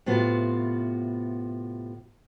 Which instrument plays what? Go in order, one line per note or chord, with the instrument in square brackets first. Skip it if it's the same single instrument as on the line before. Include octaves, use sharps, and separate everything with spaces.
[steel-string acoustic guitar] A2 C3 B3 F4 F#4